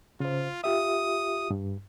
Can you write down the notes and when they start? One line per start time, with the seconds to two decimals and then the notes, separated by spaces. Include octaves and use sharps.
0.20 C#3 F4 C5
0.64 F4 G4 E5 D#6
1.50 G2